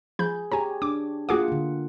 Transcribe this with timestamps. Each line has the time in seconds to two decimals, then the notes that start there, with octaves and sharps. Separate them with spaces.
0.19 F3 G#4 B5 G6
0.52 G4 G#4 C#5 G#5 A#5
0.82 D4 D6
1.29 A#3 F4 F#4 G#4 F#5 D6
1.48 D3 A#3